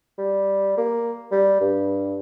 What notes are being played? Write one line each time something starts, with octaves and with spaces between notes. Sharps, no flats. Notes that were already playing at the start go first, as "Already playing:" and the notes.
G3
A#3
G3
G2